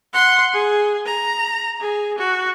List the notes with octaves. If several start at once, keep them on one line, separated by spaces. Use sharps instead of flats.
F#5 C6
G#4
A#5
G#4
F#4